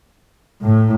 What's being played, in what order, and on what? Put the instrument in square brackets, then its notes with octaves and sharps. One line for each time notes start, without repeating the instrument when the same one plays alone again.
[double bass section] A2